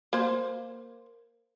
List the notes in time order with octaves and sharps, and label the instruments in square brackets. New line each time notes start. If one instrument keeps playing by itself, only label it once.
[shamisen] A#3 C5